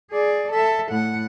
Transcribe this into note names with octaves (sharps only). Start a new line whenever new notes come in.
G#4 D5
A4 E5
A2 F#5